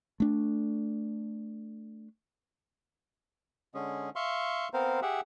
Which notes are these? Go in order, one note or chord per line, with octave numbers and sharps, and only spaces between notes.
A3 D4
D3 G#3 C#4 G#4
E5 F5 C6 C#6
B3 C4 A#4 C5 F5
G4 G#4 E5 F#5